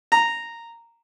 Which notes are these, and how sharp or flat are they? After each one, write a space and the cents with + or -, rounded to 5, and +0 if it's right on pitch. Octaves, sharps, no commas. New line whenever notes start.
A#5 -10